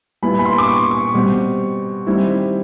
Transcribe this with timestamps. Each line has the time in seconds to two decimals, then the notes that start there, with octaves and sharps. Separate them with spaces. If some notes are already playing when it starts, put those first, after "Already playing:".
0.22 A#2 G3 B3 E4 B5
0.39 B5
0.45 C6
0.58 D6
0.68 C#6
0.91 C#6
1.14 B2 G3 C4
2.06 D#3 G3 C4 E4